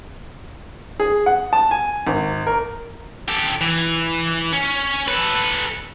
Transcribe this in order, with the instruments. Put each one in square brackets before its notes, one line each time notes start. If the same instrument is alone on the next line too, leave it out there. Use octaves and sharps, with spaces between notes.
[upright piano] G#4
F#5
A5
G#5
G#1
A#4
[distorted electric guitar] G4 A4
E3
C#4
A4 B4